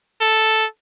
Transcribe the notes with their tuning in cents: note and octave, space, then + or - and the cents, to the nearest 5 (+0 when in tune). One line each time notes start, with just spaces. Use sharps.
A4 +0